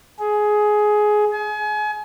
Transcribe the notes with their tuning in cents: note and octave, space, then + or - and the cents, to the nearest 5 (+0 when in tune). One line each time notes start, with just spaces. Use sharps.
G#4 +15
G#5 +35